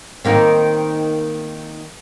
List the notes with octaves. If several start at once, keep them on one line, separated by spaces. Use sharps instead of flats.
D#3 A#3 C4